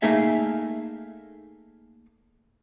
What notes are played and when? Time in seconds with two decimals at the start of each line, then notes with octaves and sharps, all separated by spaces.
0.02 A3 A#3 D#4 G#4 E5